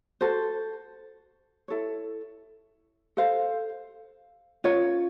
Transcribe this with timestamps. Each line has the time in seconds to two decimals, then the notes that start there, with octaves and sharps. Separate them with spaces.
0.21 F#4 A4 C5
1.68 E4 A4 C#5
3.17 A4 C5 F5
4.64 C#4 F4 A#4 C#5